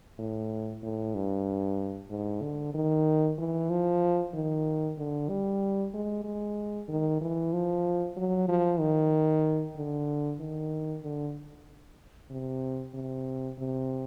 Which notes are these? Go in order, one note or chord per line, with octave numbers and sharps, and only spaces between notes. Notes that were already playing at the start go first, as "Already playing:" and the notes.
A2
A2
G2
G#2
D3
D#3
E3
F3
D#3
D3
G3
G#3
G#3
D#3
E3
F3
F#3
F3
D#3
D3
D#3
D3
C3
C3
C3